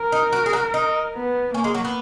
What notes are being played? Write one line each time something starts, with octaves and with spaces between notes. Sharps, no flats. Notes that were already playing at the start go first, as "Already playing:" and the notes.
Already playing: A#4
D#4
F#4
G#4
F#4
D#4
B3
A#3 C#4
G#3
F#3
B3